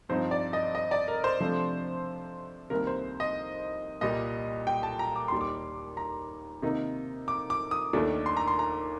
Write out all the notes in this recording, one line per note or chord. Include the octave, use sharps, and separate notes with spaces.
G2 F3 C4 D#4 C5
D5
D#5
D#5
D5
A#4
C5
C3 F3 A3 D4
C2 C3 D#3 A#3 A#4
C5
D#5
C2 A#2 G3 D#5
G5
A5
A#5
D6
D#2 D#3 G3 C6
D6
A#5
C3 D#3 A#3 D#4
D6
D6
D#6
D#2 D#3 A3 D4 D6
C6
A#5
C6
A#5